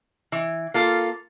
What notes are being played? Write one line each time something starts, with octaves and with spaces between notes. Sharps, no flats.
E3
A#3 F4 A4